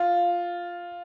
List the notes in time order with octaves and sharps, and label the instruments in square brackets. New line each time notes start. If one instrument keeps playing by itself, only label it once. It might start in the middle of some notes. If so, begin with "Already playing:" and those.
Already playing: [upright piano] F4